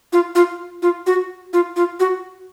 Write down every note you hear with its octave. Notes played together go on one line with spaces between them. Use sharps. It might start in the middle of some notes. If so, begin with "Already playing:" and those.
F4
F4
F4
F#4
F4
F4
F#4